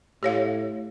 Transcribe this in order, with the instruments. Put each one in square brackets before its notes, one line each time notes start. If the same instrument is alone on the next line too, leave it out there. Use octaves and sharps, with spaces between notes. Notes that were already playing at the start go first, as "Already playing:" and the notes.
[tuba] A2 [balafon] G4 C#5 F5